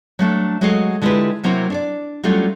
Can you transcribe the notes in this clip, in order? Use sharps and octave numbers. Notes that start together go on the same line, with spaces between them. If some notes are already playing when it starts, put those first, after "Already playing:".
F#3 A3 D4
F#3 G#3 A3 F#4 D#5 F5
D3 G#3 E4 F4 G4 B4
C3 F#3 A#3 C4 E4 F#4
D4 C#5 D5
F#3 G3 A3 C#4 D4 F4